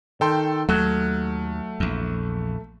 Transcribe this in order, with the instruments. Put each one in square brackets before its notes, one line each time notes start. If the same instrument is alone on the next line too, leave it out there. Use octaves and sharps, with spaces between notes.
[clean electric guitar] D#3 [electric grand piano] A4 G5 C6
[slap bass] D#2 [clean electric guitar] F#3 [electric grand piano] A3
[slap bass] A#1 E2